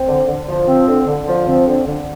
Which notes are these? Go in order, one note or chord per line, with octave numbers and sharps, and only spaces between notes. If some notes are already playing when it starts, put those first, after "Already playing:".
Already playing: C4
D3
D3
F3
C4
D3
D3
F3
C4
D3
D3